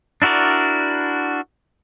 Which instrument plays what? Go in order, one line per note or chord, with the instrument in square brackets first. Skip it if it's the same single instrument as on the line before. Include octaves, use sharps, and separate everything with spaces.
[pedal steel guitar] D4 E4 F#4 A#4 D5